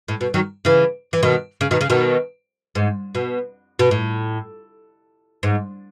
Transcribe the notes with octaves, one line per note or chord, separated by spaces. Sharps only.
A2
B2
D#3 F#3
C#3 E3
E3
B2 D#3
C#3
B2 D#3
C#3
B2 D#3
G#2
B2
B2
A2
G#2